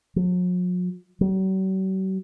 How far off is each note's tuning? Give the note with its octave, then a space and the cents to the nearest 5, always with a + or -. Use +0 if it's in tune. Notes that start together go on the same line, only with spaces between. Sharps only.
F#3 -45
F#3 +45